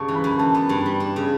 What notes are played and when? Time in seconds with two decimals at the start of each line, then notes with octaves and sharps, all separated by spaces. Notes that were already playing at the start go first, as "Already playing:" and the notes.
Already playing: G2 C#3 A5 C#6
0.08 E3
0.15 B5
0.24 F#2
0.38 E3 A5
0.54 B3
0.69 G2
0.86 G3
1.00 D4
1.16 C#3